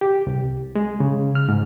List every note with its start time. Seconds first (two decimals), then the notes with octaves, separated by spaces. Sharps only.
0.01 G4
0.27 C2
0.75 G#3
1.00 C#3
1.35 F6
1.49 G#2